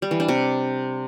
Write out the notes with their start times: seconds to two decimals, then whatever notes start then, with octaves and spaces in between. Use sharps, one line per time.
0.02 G3
0.11 E3
0.20 D4
0.28 C3